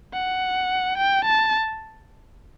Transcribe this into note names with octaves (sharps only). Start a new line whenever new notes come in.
F#5
G5
A5